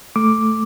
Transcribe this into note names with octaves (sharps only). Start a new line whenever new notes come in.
A3 D6